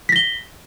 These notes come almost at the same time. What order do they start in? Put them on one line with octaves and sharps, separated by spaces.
B6 A#6 G7